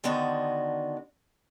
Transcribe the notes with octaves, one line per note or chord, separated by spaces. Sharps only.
D3 D#3 B3 D4 F#4 C5